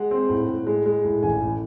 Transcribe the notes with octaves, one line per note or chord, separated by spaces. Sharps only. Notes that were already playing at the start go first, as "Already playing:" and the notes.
Already playing: G#3 F#5
C4
A2
A2
G#3
G#3
A2
A1 G#5
A2